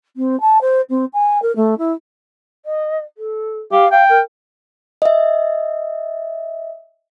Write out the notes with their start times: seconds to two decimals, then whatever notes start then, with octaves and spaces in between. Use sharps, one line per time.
0.16 C4
0.40 A5
0.61 C5
0.89 C4
1.13 G#5
1.42 A#4
1.56 A3
1.78 E4
2.65 D#5
3.18 A4
3.72 G4 F5
3.92 F5 G5
4.09 A#4
5.02 D#5 E5